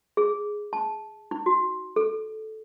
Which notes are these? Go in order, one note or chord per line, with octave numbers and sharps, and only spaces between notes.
G#4
A5
D#4
F#4
A4